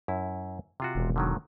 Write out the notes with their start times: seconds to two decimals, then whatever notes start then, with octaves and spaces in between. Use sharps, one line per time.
0.08 F#2 E4
0.80 C3 F4 F#4
0.95 E1
1.16 D3 D#3 F#3